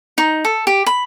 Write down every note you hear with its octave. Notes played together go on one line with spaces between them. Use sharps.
D#4
A4
G4
B5